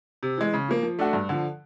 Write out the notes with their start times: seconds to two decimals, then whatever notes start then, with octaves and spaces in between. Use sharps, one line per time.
0.23 C3
0.38 E3 G#3
0.54 C#3
0.69 F3 A#3
0.83 F3
0.99 A3 D4 F#4
1.13 G2
1.29 D3 F3